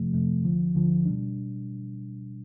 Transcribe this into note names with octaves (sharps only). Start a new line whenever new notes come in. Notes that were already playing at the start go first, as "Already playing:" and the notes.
Already playing: F2 C3 F3 A3
F2 C3 F3 A3
D2 D3 F3
D2 D3 F3
B2 G3 D4